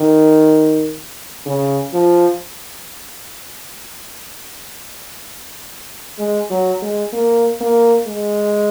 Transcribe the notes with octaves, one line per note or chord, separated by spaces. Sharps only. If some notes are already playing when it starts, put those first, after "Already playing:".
Already playing: D#3
C#3
F3
G#3
F#3
G#3
A#3
A#3
G#3